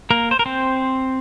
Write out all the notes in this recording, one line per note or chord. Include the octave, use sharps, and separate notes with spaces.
A#3 A#4
C5
A#4
C4 C5